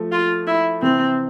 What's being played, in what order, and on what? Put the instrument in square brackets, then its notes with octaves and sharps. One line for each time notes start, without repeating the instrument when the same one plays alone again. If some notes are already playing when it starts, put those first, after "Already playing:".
Already playing: [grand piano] F3 A3
[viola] F4
E4
[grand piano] C3 E3 [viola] C4